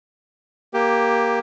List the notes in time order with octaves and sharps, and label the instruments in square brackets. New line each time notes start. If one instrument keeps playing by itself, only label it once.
[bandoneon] A#3 G4